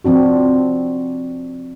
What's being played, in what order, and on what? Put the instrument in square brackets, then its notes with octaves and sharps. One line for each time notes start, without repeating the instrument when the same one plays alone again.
[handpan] F3 C4 D4 F#4